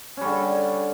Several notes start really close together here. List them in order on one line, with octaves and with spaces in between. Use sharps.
C#4 G3 D3